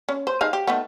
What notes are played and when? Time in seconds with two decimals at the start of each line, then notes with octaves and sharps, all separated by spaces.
0.09 C#4
0.27 C5
0.41 D#4 G#4 F5
0.53 G4
0.67 D#3 A3 B3